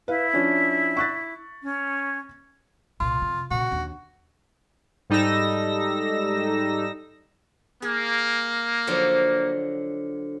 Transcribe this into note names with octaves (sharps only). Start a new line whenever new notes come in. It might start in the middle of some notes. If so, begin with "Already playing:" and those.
E4 B4 F5
F3 C#4 D4
C#6 F#6 A6
C#4
C2 A#2 F4
F2 C3
A#2 C#3 F#4
D#2 D4
G#2 G3 D#4 A4 E6 A#6
A#3 G#4
D3 F3 F#3